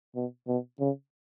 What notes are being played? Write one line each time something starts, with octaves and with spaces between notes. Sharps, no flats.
B2
B2
C#3